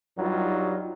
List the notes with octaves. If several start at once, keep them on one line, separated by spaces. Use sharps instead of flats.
G2 F#3 G3 D#4 F4